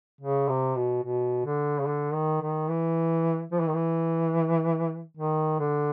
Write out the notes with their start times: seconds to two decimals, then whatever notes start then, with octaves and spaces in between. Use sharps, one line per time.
0.21 C#3
0.49 C3
0.76 B2
1.03 B2
1.45 D3
1.79 C#3
1.86 D3
2.14 D#3
2.42 D#3
2.69 E3
3.52 F3
3.60 E3
3.67 D#3
3.74 E3
5.17 D#3
5.59 D3